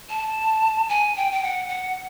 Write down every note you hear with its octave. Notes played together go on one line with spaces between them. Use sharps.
A5
G#5
G5
G5
F#5
F#5